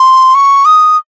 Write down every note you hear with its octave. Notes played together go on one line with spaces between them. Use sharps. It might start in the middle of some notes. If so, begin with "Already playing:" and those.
Already playing: C6
C#6
D#6